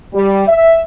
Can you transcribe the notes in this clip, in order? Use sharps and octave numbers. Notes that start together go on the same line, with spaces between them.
G3
E5